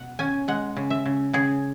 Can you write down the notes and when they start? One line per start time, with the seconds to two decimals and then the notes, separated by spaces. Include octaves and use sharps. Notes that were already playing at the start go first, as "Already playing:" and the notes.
Already playing: B2 F#5
0.19 C#4 G#5
0.48 G#3 F#5
0.77 C#3
0.90 E5
1.06 C#3
1.33 C#3 G#4